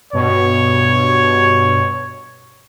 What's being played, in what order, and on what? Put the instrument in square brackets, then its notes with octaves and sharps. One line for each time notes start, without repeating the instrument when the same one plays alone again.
[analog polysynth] G2 B2 [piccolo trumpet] C#5